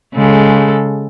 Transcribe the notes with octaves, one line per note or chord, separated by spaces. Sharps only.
C#3 G#3 A4